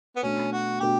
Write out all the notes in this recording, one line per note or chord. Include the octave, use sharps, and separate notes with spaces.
B3
B2 A3 C#4 D4
F#4
B2 A3 D4 G4